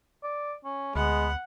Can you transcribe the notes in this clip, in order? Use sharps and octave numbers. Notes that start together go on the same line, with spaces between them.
D5
C#4
D2 G#3 B3 F#5